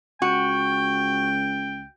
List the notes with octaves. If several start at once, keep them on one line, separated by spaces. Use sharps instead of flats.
C#2 F#4 G5